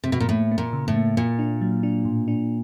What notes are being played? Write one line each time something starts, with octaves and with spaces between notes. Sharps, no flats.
C3
B2
A#2
A2 A#3
A#3
A#2
C#3
A2
A#3
A#2 A#3
D4
F#3
D4
A2
D4